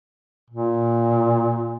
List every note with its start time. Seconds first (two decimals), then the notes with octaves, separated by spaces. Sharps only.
0.50 A#2